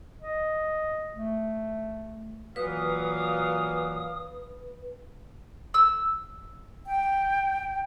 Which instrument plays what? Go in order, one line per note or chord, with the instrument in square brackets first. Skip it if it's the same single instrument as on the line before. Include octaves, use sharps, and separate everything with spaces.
[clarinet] D#5
A3
[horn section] A#2 F#3 F5 [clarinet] E3 [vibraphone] B4 [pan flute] D#6
[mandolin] E6
[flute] G5